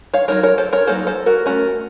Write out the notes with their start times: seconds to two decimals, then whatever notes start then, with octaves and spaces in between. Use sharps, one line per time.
0.14 C#5 F5
0.28 F#3 A#3 D#4 A#4 C#5
0.43 A#4 C#5
0.58 A4 C5
0.73 A#4 C#5
0.87 F#3 A#3 D#4 A4 C5
1.07 A4 C5
1.26 F#4 A#4
1.46 A3 C#4 F#4 A#4